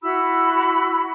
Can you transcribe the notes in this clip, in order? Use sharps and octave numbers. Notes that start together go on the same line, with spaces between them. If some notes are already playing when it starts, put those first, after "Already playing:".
E4 F#4 B5 E6